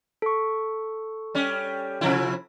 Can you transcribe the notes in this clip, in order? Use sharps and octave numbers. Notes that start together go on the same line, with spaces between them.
A4 C#6
G3 C#4
C3 F3 E4